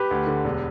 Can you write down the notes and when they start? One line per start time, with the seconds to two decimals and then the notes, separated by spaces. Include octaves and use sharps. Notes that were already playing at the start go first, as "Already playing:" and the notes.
Already playing: G4 B4
0.11 D2
0.27 D3
0.44 E1